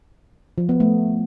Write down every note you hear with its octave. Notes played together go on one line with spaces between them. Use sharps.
F3
B3
A3